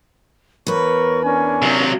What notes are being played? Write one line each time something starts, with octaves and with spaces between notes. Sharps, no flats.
E2 A#4 B4 C#5 C#6
C#4 D4 A#4 G#5
C3 F#3